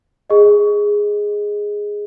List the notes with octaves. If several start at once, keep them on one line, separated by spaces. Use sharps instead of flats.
G#4 D#5